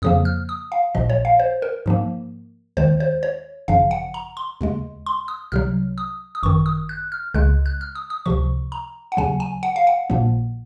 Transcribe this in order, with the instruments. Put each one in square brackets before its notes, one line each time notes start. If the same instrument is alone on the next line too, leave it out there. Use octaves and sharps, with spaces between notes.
[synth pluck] F2 C#3 F3 A#3 D#6
F6
D#6
F5
A#1 A#2 F3 D#5
C#5
F5
C5
A#4
G#2 F3 A#3
D#2 D#3 G#3 C5
C5
C#5
G#1 F#2 C#3 F3 F5
F#5
A#5
C6
D#2 C#3 G#3
C6
D#6
C2 C3 F#3 F6
D#6
D#6
G#1 F#2 D#3 C#6
D#6
F#6
F6
C#2 C#3 G#3 F#6
F#6
F6
D#6
D#6
C#2 C3 F3 C#6
A#5
F#5
D#2 C#3 F#3 G#5
G#5
F#5
F5
F#5
A#1 A#2 F3 A#3